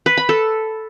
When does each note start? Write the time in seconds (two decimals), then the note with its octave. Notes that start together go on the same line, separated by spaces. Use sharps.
0.06 B4
0.17 B5
0.29 A4